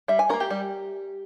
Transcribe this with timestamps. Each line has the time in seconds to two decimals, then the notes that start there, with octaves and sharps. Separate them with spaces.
0.08 G3 E5
0.19 G#5
0.29 A#3 C#4 A#4
0.40 G4
0.50 G3